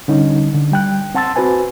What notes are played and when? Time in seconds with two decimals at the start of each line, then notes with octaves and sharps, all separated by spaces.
0.08 D3 G3 C#4 D#4
0.55 D3
0.72 G3 G5 F#6
1.15 C4 F#5 A5 C6 E6 A6
1.36 C4 F#4 B4 C5 G#5